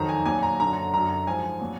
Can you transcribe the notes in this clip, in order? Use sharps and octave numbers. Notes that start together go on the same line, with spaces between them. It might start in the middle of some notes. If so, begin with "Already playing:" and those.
Already playing: F2 D#3 F#3 A#5
G#5
A#2 F#3 G#5
A#5
F#2 D3 F#3 A#5
F#2 D3 F#3 A#5
G#2 F3 G#5
A#2 F#3